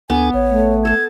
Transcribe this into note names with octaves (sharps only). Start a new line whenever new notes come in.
D2 B3 D4 A4 G#5
A1 C#5
A3
A4 A5 G#6